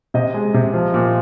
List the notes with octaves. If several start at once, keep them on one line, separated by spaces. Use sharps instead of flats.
C3 D#5
G#3
C3
F3
A#2